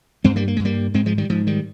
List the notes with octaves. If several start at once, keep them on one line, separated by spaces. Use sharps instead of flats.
G2 G#3 C4
G3 A#3
A#3
G2 G#3
G3 A#3
G#2 G#3 C4
F3 G#3
D#3 G3
G#2 F3
D#3 G3